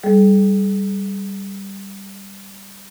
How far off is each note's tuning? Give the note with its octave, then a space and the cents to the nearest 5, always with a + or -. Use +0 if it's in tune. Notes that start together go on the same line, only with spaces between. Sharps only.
G3 +0 G#4 +45